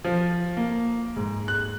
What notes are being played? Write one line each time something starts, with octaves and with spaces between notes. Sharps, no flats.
F3
A#3
G#2
F#6